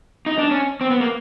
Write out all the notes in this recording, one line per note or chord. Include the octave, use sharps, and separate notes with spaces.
D#4
D4
C#4
C4
B3
A#3